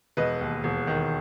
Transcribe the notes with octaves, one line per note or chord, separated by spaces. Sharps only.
E1 B4 D#5
D#2
E1
D#3